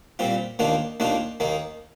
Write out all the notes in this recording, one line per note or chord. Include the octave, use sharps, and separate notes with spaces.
A#2 G3 C4 F4
D#2 D#3 A#3 D4 F4
D#2 D#3 A#3 D4 F4
D#2 D#3 A#3 D#4